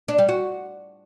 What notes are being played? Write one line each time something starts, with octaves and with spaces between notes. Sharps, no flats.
D4
G3
F#4